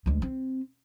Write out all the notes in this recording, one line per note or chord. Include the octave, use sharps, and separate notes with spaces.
D2 G#3
C4